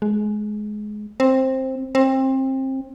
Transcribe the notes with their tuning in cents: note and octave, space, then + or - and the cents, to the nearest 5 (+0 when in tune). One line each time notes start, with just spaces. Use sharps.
G#3 +20
C4 +10
C4 +25